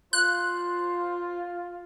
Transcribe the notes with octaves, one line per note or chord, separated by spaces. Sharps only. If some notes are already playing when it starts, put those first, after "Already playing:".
F4 C5 F#6